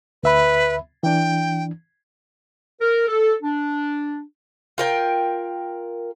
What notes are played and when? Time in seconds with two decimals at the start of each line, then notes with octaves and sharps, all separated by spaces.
0.23 D2 B4 E5 B5
1.03 E3 D4 G5
2.81 A#4
3.08 A4
3.43 D4
4.78 F4 A#4 G5